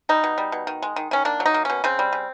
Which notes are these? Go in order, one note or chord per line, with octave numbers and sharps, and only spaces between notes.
G3 D#4
B2
G3
B2
D#3
G#3
D#3
D#3 C#4
A#3 D4
F#3
D#4
A#3
B2 C#4
C#3 C4
G3
C#3